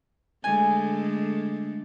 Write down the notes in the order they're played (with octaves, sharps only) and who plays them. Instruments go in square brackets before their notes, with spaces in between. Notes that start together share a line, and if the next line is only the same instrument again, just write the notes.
[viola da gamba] D3 G#3 A3 [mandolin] G#5